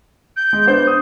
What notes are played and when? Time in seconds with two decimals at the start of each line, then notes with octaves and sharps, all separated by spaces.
0.37 G6
0.53 G#3
0.66 B3 D4 C5
0.87 D#6